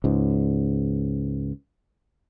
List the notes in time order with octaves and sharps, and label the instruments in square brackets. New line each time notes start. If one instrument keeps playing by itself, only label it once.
[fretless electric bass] C#2 G#2